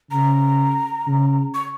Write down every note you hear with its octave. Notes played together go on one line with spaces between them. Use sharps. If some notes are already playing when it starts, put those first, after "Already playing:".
C#3 A#5
C#3
C#6